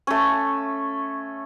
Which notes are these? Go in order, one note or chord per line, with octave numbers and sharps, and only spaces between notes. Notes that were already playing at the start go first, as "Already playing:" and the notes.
A3 C#4